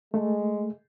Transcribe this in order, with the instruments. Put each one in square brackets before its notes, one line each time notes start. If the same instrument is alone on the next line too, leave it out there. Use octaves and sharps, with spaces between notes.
[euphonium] G#3 [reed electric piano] A3